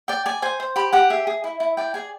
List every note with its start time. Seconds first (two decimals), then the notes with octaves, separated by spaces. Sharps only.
0.08 D5 G5
0.26 D5 G#5
0.42 C5 G#5
0.60 C5
0.76 G4 B5
0.93 G4 F#5
1.10 G#4 E5
1.27 G#4
1.44 E4
1.60 E4
1.77 D5 G5
1.94 G#4 G#5